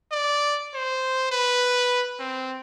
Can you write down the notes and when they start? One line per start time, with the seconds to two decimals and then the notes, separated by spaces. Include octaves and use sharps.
0.12 D5
0.74 C5
1.32 B4
2.20 C4